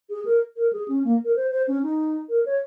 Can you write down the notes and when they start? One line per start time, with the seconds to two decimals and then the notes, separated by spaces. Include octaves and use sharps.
0.10 G#4
0.25 A#4
0.57 A#4
0.73 G#4
0.88 C#4
1.04 A#3
1.25 A#4
1.36 C5
1.52 C5
1.68 C#4
1.83 D#4
2.29 A#4
2.46 C#5